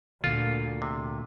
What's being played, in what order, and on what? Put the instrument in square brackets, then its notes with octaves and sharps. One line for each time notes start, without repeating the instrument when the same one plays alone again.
[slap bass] D2 D3 [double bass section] A#2 [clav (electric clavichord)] F4
[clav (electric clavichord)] C3